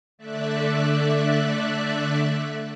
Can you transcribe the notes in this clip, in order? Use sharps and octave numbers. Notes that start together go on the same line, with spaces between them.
D3 A3 D5 E5 F#6